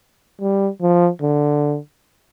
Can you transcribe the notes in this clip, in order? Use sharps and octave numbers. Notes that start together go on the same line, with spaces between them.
G3
F3
D3